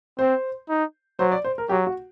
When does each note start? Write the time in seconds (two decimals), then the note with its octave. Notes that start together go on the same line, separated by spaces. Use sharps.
0.19 C4 C5
0.69 D#4
1.19 F#3 C5
1.32 D5
1.45 C5
1.58 A#4
1.69 F#3 G4
1.87 F#4